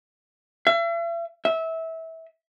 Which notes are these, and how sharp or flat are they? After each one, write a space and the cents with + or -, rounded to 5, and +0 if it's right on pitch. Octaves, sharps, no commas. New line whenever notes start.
E5 +40
E5 -20